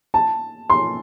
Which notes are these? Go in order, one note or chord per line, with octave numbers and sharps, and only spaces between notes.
A5
C6